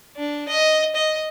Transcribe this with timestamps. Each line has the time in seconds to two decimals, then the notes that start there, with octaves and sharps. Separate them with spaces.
0.16 D4
0.48 D#5
0.95 D#5